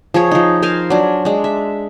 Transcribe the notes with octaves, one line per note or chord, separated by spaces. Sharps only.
F3 G#4 C#5
F3 D#4
A#4 C5 F5 G#5
F#3 D4
G#3 D4
E5